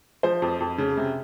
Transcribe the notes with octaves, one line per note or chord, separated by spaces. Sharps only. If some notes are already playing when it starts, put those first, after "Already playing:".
F3 C5
F2
F2
C#3
C3